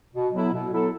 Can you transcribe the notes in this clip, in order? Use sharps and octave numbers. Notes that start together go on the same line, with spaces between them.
B2
F#3 B3 E4 A4
B2
F#3 B3 E4 A4